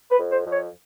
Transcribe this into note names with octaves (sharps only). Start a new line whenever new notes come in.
B4
F2
C5
F2
C#5